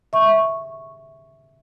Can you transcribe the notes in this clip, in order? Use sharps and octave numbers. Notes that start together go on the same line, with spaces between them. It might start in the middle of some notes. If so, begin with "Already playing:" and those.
E5 C#6